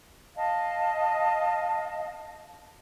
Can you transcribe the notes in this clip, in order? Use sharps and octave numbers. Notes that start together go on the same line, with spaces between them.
D#5 F5 A5